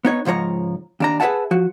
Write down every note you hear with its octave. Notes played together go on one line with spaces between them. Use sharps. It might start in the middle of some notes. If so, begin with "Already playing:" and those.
B3 D#4 C#5
C#2 G#2 F3 C#5 A#5
D#2 D4 A#5
G#4 B4 C#5 E5 F#5 A5
F3 F#4